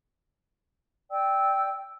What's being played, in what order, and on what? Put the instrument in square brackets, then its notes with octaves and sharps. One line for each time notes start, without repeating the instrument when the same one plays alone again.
[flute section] D5 G5 E6